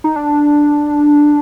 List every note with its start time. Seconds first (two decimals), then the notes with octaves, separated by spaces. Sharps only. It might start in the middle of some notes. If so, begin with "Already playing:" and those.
0.04 D#4
0.16 D4